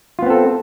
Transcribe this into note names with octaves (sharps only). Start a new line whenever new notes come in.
B3 C4 F4 A4